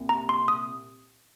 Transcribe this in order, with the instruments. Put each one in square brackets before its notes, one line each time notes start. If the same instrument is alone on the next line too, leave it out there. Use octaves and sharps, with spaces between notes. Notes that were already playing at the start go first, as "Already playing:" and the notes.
Already playing: [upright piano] C2 A#2
[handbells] A#5
C6
D#6